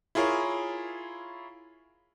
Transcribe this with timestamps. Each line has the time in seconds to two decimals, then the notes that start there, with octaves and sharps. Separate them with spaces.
0.15 E4 F4 G#4 A#4 C#5